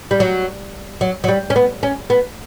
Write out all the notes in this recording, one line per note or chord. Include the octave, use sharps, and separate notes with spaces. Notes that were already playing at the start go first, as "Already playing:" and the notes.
G3
F#3
F#3
F#3
G3
C#4
B3
C#4
B3